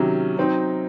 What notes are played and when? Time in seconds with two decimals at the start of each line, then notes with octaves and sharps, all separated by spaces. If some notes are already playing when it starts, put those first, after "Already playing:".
Already playing: C3 D#3 F#3 C#4
0.37 F#3 C4 D#4